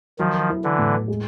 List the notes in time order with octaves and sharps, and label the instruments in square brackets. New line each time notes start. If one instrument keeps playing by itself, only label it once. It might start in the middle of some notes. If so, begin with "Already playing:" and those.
[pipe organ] D#3 F3 [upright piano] F#3
[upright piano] E4
[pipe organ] D3 E3
[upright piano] A2
G#3